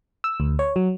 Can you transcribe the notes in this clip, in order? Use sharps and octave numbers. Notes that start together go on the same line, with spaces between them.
E6
D2
C#5
F#3